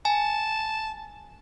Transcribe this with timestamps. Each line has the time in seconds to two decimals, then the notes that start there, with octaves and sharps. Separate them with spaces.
0.05 G#5 A5